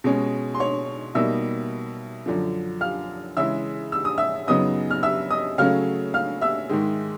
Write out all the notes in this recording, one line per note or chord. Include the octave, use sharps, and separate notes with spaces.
B2 G#3 C#4
C6
C#5 C#6
B2 G3 A#3 D#4 E5 E6
F#2 D3 F3
F5 F6
C#3 E3 G#3 E5 E6
E6
D#6
E5 E6
F#2 C#3 F#3 B3 D#4 D#5 D#6
F6
E5 E6
D#5 D#6
C#3 F#3 A3 C#4 F5 F6
F5 F6
E5 E6
G#2 D#3 G#3